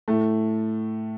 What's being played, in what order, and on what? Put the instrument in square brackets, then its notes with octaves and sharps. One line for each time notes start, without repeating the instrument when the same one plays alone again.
[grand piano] A2 A3